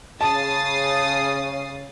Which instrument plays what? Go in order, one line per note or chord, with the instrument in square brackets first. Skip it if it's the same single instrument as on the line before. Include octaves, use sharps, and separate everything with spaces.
[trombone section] C#3 [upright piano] A5 [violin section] D#6 A6 C7